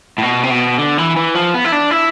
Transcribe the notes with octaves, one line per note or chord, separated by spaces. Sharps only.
A2
B2
C3
B2
D3
E3
E3
F3
B3
E4
D4
E4